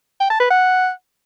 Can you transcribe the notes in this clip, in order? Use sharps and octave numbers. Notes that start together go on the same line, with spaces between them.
G5
A5
B4
F#5